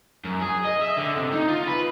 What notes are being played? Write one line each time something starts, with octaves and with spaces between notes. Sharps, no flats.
F#2
G#4
D#5
E5
D3
C3
D#4
F4
B4